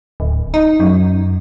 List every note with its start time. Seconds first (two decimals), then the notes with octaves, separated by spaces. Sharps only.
0.20 D1
0.54 D#4
0.80 F#2